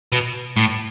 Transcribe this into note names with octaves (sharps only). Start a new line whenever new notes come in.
B2
A2